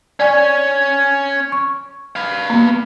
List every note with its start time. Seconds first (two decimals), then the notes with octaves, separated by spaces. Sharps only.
0.20 C#4 C#5 D5 G#5
1.52 C#6
2.16 B4 F5
2.50 A#3 B3